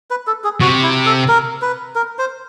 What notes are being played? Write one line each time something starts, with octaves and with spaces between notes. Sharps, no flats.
B4
A4
G#4
C3 F#4
E4
A4
A#4
B4
A#4
C5